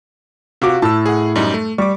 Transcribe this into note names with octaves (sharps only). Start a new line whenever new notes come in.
C3 F4 F#4 D6
A2 A5 E6
G#4 F#5
F#2 G3 D#4
A3
G3 C#6 D6